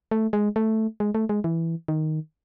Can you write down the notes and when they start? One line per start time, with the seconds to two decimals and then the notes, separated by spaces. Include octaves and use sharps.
0.11 A3
0.33 G#3
0.56 A3
1.00 G#3
1.15 A3
1.29 G#3
1.44 E3
1.88 D#3